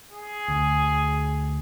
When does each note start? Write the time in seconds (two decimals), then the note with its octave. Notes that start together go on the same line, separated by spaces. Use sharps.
0.13 G#4
0.48 D2